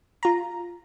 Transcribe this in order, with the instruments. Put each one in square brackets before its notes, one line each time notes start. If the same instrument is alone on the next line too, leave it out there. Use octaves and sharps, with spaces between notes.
[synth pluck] F4 A#5